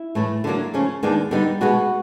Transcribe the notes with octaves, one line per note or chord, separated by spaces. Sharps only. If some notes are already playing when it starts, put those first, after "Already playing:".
Already playing: E4
A2 E3 A3
D3 F#3 A#3
C#3 F3 A3 C#4
D#2 D#3 G#3 B3 D4
D3 G3 B3 D#4
B2 G#3 B3 F#4